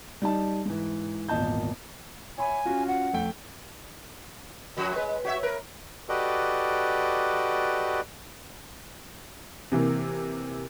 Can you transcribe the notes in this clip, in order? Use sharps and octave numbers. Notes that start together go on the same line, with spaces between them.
G3 D#4 A5
G#2 E3
G#1 E2 A#2 D#5 A5 G6
C#5 E5 G#5 B5
C#4 F4 F#4
F#5
F2 A3 G5
F#2 F3 F#4
G#3 B4
F#4 C#5 E5
A#4 B4
F#4 G4 A4 B4 D5 D#5
C3 E3 A#3